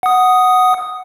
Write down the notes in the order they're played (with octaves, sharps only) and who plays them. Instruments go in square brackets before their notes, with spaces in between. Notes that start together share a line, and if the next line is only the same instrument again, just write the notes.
[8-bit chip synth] F#5 D#6